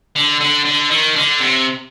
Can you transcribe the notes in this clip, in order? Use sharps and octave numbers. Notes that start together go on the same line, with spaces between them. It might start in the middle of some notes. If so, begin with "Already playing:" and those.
D3
D3
D3
D#3
D3
C3